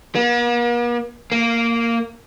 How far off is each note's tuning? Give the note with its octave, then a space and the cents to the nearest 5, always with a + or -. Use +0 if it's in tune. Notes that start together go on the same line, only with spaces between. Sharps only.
A#3 +45
A#3 -10